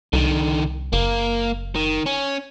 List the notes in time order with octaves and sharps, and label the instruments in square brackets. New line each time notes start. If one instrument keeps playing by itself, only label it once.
[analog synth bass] C2 [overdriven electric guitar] D3 D#3
[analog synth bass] F#1 [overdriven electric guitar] A#3
[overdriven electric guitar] D#3
C#4